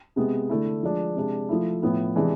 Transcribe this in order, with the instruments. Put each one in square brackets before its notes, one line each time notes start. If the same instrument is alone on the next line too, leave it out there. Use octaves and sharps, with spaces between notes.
[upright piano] C3 G#3 B3
D3 A3 E4
F3 G#3 D4
C3 G#3 D4
F3 A3 E4
A2 F3 B3 E4
C3 E3 G#3 D4